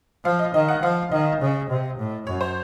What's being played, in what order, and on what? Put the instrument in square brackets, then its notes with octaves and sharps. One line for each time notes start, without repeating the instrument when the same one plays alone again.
[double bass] F3 [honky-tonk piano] F5
[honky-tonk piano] D#5
[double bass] D#3 [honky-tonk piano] D#5
[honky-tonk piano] F#5
[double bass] F3 [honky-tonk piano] F5
[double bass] D#3 [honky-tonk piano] D#5
[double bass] C#3
C3
A2
[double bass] F#2 [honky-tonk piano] C#5
[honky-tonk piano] C5